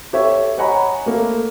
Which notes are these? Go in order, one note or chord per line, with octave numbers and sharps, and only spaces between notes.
G4 A4 C#5 E5
C#5 D#5 F#5 G#5 A#5 B5
A3 A#3